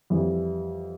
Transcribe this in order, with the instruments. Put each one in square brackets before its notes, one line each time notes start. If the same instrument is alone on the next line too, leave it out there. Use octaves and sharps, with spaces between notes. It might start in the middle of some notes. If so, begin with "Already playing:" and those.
[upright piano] F2 E3 G3